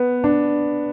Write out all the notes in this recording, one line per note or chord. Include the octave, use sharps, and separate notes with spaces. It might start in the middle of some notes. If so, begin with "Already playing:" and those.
Already playing: B3
D4